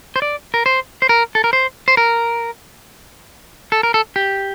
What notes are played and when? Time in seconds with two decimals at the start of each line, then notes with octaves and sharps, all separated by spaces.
0.16 C5
0.22 D5
0.54 A#4
0.66 C5
1.02 C5
1.09 A#4
1.35 A4
1.44 A#4
1.53 C5
1.88 C5
1.97 A#4
3.72 A4
3.83 A#4
3.94 A4
4.16 G4